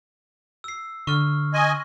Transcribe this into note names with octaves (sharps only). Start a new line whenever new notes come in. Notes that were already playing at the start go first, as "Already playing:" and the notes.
E6 C7
D3 C#6 F6
D#5 G#5 C6 C#6